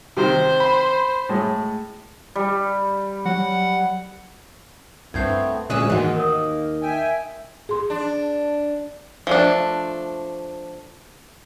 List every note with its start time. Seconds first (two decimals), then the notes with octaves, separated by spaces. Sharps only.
0.17 C3 D#3 C5
0.60 B5
1.29 A2 G#3
2.35 G3
3.26 F#3 F#5
5.14 C2 G2 A3 B3 C4 G6 G#6 C7
5.70 D2 A#2 D3 G#3 C#4 D#6 E6 F#6
5.90 D#2 G#2 D#3 E3 G#3 F#4 F#5
6.15 A#3 A#4 D#5 D#6
6.82 E5 G5 G#5
7.69 G#4 C6
7.90 D4
9.27 F3 A3 D4